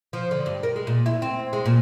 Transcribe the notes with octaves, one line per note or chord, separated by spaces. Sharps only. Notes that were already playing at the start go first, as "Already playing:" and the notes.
F3
D3
G2
A#4
G#3
A#2
E4
C4
G#3
A#2